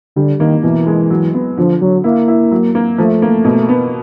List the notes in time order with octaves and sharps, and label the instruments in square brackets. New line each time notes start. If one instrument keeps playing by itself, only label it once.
[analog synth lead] D3 [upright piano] G3
[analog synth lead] D#3 [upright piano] A#3
[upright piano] B2 [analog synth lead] E3
[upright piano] G#3
F#3
B3
[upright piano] D3 [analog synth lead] F3
[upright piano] D3 [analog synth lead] F#3
[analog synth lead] A#3 [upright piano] E4
[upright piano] E4
F#3
A#3
[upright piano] F3 [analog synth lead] A3
[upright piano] A#3
B2
B3